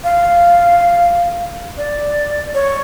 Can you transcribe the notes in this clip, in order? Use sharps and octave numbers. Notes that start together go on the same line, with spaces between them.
F5
D5
C#5